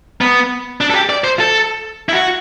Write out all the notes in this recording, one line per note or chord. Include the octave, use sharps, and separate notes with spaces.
B3
D4
A4
G4
D5
C5
A4
E4
F#4